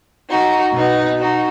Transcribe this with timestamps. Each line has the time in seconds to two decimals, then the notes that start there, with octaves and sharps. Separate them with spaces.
0.29 D#4 F#4
0.74 B2 B3 D#4
1.19 D#4 F#4